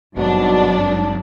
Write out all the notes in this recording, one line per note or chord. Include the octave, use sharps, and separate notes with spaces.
G#1 G2 B2 F#3 D4